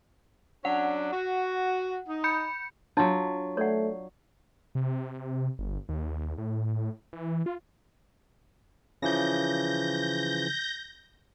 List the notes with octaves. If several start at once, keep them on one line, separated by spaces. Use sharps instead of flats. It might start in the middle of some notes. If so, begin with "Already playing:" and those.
F#3 C#4 D4 F#5
F#4
D#4
B5 G6 C#7
F#3 D4 F4 C#5 A5
A3 C#5 D5 F#5
C3
G1
D#2
A2
E3
F4
C#3 E3 F3 G6 A#6